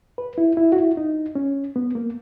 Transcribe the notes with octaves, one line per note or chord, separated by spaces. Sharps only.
B4
E4
E4
F#4
E4
D#4
C#4
B3
A#3